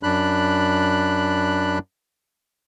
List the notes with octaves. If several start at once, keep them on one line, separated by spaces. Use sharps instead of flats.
F#2 D4 B5 F#6